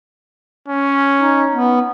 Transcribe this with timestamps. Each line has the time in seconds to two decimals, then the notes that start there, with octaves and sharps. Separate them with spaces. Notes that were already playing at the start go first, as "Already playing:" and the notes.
0.68 C#4
1.20 D#4
1.55 B3